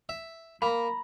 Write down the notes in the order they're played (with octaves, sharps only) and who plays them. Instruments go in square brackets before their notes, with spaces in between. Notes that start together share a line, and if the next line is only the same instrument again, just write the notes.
[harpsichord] E5
[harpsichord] A#3 [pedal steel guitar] A#5 B5